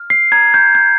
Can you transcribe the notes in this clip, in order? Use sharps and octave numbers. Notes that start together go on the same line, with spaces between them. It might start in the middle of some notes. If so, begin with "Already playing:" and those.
Already playing: F6
C7
A#5 G#6
G6
G6